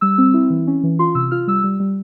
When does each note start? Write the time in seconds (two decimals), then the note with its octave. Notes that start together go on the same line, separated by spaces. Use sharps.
0.01 G3 E6
0.18 C4
0.34 E4
0.50 E3
0.67 C#4
0.83 E3
0.99 F4 C6
1.15 C3 E6
1.31 F4 F6
1.47 G3 E6
1.64 G3
1.80 G3